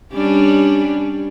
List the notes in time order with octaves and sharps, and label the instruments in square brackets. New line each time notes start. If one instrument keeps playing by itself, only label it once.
[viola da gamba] G3 C#4 D4